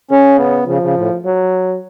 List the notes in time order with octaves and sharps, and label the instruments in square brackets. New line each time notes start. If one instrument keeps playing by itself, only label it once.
[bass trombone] C#3 [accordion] C#4
[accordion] B3
[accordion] C#3 [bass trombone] F3
[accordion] C#3
A2
[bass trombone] F#3